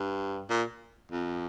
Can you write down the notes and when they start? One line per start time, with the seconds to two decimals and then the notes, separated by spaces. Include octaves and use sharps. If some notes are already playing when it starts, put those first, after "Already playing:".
Already playing: G2
0.49 A#2
1.11 F2